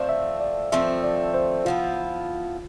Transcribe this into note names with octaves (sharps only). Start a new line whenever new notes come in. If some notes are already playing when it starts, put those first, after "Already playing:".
Already playing: F3 A3 C4 D5
E5
D5
F3 A3 C4 E5
D5
C5
F3 B3 E4 F4